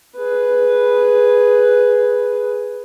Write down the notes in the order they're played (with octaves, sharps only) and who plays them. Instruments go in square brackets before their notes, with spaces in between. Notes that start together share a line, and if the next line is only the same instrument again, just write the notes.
[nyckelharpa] G#4 B4